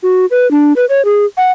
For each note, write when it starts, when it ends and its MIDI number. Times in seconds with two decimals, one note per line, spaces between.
0.03 0.26 66
0.31 0.49 71
0.51 0.73 62
0.76 0.85 71
0.89 1.04 73
1.05 1.25 68
1.37 1.52 78